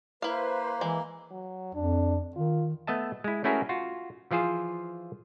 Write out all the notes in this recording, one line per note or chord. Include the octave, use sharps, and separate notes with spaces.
A#3 E4 B4 C5 F5
E3 G#3
F#3
F2 D4
D#3 F4
A3 B3 D#5 E5 A5
G#3 E4
A3 C#4 E4 F#4 G#4 A#4
F4 F#4
E3 F3 F4 G#4 C5